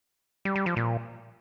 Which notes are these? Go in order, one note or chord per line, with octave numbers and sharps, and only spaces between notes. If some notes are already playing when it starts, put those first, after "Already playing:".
G3
G3
F3
A#2